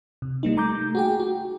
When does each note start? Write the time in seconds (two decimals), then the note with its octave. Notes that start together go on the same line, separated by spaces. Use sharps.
0.22 C3
0.43 G3 A#3 D#4
0.57 A3 A#5 D6 G6
0.95 F#4 G#4 G5
1.20 F#4